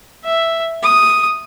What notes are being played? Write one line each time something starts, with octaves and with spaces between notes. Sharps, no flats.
E5
D#6